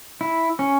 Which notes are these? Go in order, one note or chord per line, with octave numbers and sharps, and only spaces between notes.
E4
C#4